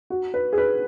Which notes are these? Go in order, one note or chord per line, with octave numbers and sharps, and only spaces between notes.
F#4
B4
G#4
B4